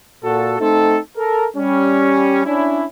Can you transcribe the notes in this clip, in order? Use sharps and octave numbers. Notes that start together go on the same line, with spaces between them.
A#2 F#4 A4
A3 C4 D#4 A4
A4 A#4
G3 C#4
C#4 D4 E4